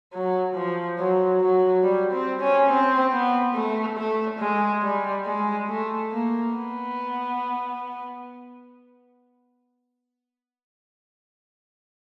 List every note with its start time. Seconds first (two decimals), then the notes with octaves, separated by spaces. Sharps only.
0.13 F#3
0.55 F3
0.98 F#3
1.41 F#3
1.83 G3
2.12 C4
2.40 C#4
2.69 C4
3.12 B3
3.54 A3
3.97 A3
4.39 G#3
4.82 G3
5.25 G#3
5.69 A3
6.11 A#3
6.54 B3